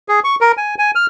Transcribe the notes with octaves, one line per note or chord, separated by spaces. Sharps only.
G#4
C#6
A#4
G#5
G#5
F6